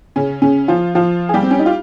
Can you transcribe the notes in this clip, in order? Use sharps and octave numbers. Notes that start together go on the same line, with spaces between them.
C#3 C#4
C#3 C#4
F3 F4
F3 F4
G#4
G3 G4
C4
C#4
D#4
F4